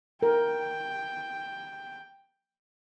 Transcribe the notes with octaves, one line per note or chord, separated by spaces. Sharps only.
A#4 G5